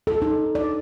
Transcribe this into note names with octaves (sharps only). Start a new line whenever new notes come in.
A4
D#4
D5